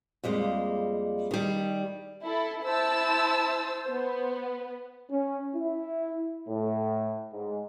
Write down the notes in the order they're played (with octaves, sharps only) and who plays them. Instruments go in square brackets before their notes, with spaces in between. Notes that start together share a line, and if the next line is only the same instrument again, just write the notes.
[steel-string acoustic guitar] F2 G3 G#3 A#3
D#3 G3
[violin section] E4 A4
[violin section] E4 A5 E6 [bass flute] C5
[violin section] B3
[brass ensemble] C#4
E4
A2
G#2